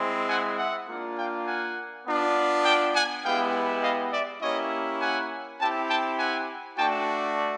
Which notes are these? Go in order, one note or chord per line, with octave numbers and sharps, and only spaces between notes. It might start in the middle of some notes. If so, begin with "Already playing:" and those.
Already playing: G#3 C4 E4
F#5 G#5
E5 F#5
A#3 D4 F4
F5 G5
F#5 G#5
B3 D4 F4
G5 A5
F#5 G#5
G#3 B3 E4 G4 F5 G5
D#5 F5
D5 E5
A#3 C#4 E4 G4 C#5 D#5
F#5 G#5
C4 E4 G4 G5 A5
G5 A5
F#5 G#5
A3 D4 F#4 G5 A5